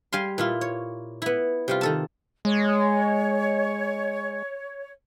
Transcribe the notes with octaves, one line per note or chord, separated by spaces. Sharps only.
G3 F5 G#5 C6
A#2 E4 F4
C#5
B3 E4
C3 G3 F4
D#3 A4 A5
G#3 C#5